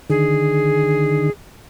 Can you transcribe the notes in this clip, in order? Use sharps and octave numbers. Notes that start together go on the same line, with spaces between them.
D3 D#3 G#4